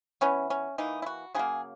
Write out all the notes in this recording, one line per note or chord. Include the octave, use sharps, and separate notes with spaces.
E3 B3 C#4
C#4
E3 A#3 D#4
E4
F#4
C#3 F#3 A#3 G#4